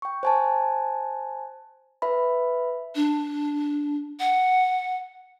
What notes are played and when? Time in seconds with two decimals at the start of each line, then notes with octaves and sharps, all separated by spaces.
0.02 G5 C#6
0.23 C5 G#5 A5
2.02 B4 E5 B5
2.95 D4
4.20 F#5